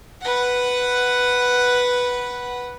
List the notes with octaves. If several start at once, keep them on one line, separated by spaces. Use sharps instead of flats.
B4 F#5